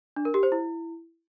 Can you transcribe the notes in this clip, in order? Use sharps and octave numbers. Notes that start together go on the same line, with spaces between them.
D4
A#4
G4
C5
E4